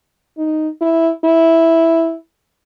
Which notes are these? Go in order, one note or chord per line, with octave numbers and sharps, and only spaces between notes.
D#4
E4
E4